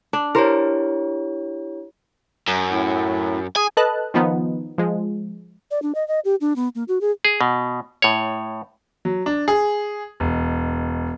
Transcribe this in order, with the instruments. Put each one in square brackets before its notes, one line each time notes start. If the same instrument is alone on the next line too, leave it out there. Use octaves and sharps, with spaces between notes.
[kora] D4
[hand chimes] E4 G4 C#5 [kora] A#4 C5
[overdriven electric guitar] F#2
[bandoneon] A2
[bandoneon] G#4 [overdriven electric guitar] G#5
[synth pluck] A4 B4 D#5 A5 F#6
D#3 F3 B3 D#4
F3 G#3
[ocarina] D5
D4
D#5
D#5
G4
D4
B3
A#3
F#4
G#4
[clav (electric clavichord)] G#4
B2
A2 C#5
[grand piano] F#3
D4
G#4
E1